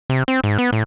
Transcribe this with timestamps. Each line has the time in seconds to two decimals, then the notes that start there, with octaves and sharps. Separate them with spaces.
0.10 C3
0.28 C4
0.44 G#2
0.59 B3
0.73 A2